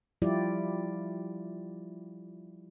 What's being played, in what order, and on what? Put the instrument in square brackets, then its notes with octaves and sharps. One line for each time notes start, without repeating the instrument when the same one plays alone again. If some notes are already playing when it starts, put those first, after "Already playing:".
[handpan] F3 G3 E4 F4 G4 D5